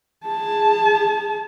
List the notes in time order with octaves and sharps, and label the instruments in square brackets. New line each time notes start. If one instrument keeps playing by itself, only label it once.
[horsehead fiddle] G#4 A5